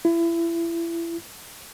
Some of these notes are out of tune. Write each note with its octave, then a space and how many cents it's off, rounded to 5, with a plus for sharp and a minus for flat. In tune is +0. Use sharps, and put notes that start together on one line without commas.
E4 +30